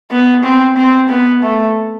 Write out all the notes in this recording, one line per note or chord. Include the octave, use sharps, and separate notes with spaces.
B3
C4
C4
B3
A3